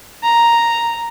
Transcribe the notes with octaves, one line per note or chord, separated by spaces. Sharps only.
A#5